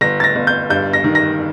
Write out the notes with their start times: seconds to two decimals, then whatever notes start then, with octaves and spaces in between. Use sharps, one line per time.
0.01 G1 A#6
0.20 A6
0.24 A#6
0.36 G1
0.47 G6
0.70 G2 G6
0.93 A#6
1.04 D#3
1.15 A#6